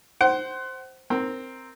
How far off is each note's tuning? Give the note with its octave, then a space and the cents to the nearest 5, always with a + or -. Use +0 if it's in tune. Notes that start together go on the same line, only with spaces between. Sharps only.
C5 +0 F#5 +30
C4 +0 A#4 +0